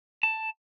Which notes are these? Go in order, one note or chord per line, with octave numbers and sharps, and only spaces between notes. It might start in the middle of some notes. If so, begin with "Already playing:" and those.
A5